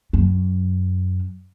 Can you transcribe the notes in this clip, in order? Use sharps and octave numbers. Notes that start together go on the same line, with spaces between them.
F#2